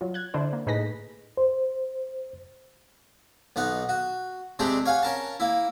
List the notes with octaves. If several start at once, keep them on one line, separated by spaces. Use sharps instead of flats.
F#3 F4
F#6 G#6
D3 D4 E4 C5
A#3
A2 D#4 G#4 B4 A#6 B6
C5
B1 B3 D#4 F#5
F#4
C3 G#3 A3 C4 D4 G4
C#5 F5 F#5 G#5
C#4 A#4 A5
A#3 E4